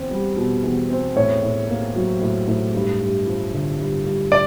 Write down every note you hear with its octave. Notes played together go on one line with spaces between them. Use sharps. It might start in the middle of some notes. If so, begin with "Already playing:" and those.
Already playing: E2 C4
G3
B2
E2
C4
A2 C#5
A2
A#3
F#3
A2
A2
G2
G2
F3
D3
G2
G2
D5